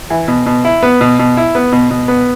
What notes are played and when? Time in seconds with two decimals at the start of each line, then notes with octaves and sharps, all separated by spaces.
0.10 E3
0.28 B2
0.46 B2
0.65 E4
0.83 B3
1.01 B2
1.19 B2
1.37 E4
1.55 B3
1.72 B2
1.90 B2
2.08 B3